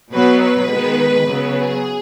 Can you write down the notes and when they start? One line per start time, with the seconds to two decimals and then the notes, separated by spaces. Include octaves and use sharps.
0.13 B2 F#3 B3 B4
0.43 B4
0.71 D#3 G#3 B3
1.28 C#3 F#3 B3
1.57 G#4